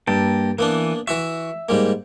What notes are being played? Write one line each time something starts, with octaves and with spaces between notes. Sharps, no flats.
G2 A#3 G5 A5
E3 A#3 B3 D4
E3 F#4 E5 C#6
G#2 G3 A#3